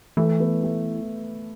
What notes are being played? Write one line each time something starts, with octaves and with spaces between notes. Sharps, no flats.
E3 A3
B3
A3